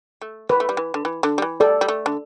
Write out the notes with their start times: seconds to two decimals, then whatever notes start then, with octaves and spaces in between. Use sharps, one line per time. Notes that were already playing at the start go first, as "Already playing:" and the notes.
0.21 A3
0.49 E3 B4
0.60 A3
0.69 G3
0.77 E3
0.94 D3
1.05 E3
1.23 D3
1.38 G3
1.42 E3
1.60 G3 A4 D5
1.81 G3
1.88 A3
2.06 D3